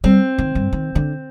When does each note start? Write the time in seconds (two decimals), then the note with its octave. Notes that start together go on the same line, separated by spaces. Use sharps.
0.04 G3 C4
0.38 D#3
0.55 G2
0.73 D#3
0.95 D3